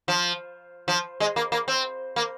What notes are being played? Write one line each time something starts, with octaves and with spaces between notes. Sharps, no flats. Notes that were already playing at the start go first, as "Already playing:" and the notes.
F3
F3
G#3
A#3
A#3
C4
A#3